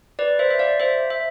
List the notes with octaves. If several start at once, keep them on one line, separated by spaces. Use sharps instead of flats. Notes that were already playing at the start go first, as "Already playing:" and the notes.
B4 D5
C5 E5
E5
D5 F5
C5 E5
E5